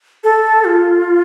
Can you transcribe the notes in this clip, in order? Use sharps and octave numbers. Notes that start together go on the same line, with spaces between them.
A4
F4